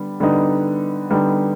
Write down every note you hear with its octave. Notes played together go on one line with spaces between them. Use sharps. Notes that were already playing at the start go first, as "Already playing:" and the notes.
Already playing: D3 G3 B3
D3 G3 B3 D#4
D3 G3 B3 D#4